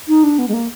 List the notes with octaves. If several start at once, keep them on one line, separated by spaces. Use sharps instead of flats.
D#4
D4
B3
G#3
A#3